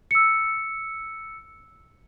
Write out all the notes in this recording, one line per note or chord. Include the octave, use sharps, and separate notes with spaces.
E6 C#7